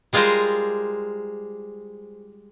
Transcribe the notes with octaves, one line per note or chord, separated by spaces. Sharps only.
G3 G#3 F4 G#4 A#4 C5